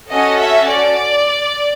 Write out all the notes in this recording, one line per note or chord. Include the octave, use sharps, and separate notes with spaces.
C#4 F#4 A4 D#5
E5
D5